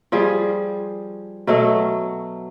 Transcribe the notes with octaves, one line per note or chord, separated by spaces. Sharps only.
F3 G3 G#4
B2 F#3 A3